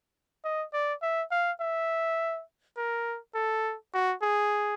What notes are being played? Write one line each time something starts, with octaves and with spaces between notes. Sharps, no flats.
D#5
D5
E5
F5
E5
A#4
A4
F#4
G#4